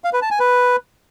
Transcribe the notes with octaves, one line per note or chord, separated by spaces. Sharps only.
F5
B4
A5
G#5
B4